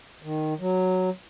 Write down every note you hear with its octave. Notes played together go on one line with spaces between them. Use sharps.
D#3
F#3